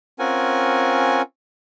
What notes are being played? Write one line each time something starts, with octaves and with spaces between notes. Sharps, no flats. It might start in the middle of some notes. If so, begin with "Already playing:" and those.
C4 C#4 F4 A#4 F#5 G#5